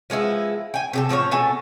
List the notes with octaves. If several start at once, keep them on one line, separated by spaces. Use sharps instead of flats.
F3 G#3 B3 E4
G5 G#5
C3 G4 A4
A2 F3 F#4 C#5
B2 B3 A4 G#5